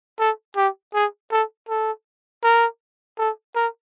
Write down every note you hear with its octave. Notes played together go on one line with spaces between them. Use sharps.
A4
G4
G#4
A4
A4
A#4
A4
A#4